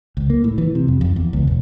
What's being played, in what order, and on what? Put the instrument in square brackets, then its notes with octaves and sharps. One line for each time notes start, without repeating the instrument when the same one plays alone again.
[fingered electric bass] C#2
A#3
A2
E3
C3
F2
F2
E2
C#2
E1